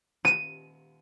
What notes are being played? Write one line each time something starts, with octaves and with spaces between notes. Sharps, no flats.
D#7